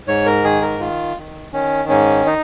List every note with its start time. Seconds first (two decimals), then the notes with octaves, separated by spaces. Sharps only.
0.07 G#2 C#5
0.26 A#4
0.44 D#3 G#4
0.62 A#4
0.80 D#3 F4
1.17 D#3
1.53 D#3 C#4
1.89 G#2 C#4
2.26 D#4